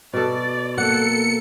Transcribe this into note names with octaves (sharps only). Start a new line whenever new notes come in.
B2 A4 D5
A#3 A4 F#5 C#7